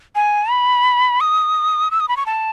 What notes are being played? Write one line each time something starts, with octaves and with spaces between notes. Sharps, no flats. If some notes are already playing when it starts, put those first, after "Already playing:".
G#5
B5
D#6
E6
D#6
B5
C#6
A5